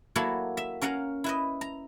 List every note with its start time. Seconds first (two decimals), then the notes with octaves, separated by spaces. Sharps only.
0.16 F#3 A#3 E4 F#4 A4
0.57 E5
0.81 C#4 A#4 F5 F#5 A#5
1.24 E4 B4 D#5
1.61 A#5